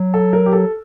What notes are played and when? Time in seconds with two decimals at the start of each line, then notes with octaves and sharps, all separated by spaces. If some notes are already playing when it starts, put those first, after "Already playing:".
Already playing: F#3
0.14 A4
0.33 A#4
0.46 G4
0.53 A4